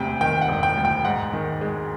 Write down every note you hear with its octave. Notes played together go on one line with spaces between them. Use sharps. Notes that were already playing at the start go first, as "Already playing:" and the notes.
Already playing: E1 D2 C3 G5
D#3 G5
F#5
E1
G5
D2
G5
G#2 F#5
D#3
G#3